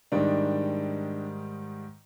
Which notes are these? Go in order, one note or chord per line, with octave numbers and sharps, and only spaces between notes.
G#2 D#3 G3 D4